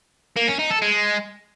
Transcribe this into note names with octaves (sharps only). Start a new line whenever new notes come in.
A#3
C#4
D#4
A4
G#3